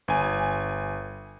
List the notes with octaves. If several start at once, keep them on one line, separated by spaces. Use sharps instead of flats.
G1 G#5